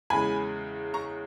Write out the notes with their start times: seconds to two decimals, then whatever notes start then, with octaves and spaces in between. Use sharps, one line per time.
0.10 E2 C#3 G#3 G#5 B5
0.94 A#5 C#6